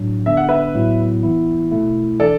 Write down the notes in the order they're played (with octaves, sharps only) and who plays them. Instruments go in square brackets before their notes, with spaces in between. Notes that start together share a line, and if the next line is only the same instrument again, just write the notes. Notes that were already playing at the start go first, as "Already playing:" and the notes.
Already playing: [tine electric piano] A2 F#3 D4
[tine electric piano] D3 B3 D4 [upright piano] E5
[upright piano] F#5
B4 E5
[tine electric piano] A2 F#3 B3 E4
E3 B3 E4
B2 A3 E4
[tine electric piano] E3 D4 [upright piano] A4 D5